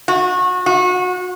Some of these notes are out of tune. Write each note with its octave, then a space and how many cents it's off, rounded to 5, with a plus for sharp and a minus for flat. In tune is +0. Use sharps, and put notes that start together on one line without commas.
F#4 -25
F#4 -30